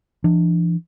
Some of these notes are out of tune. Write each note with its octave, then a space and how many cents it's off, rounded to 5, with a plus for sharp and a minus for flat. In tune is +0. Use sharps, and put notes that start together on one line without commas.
E3 +45 D4 +25